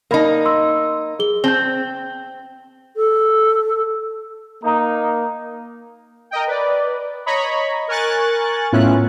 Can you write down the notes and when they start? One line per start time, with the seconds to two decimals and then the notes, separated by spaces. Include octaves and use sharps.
0.11 A#3 D#4 A#4 B5
0.45 C6 E6
1.19 G#4 G7
1.44 C4 G6 G7
2.96 A4
4.64 A#3 D#4
6.31 A#4 D#5 G5
6.47 B4 D5
7.26 C#5 D#5 A#5 B5 C#6
7.88 A#4 G#5 C#6 F#6 A6
8.72 A2 B3 C#4 E4 F4 F#6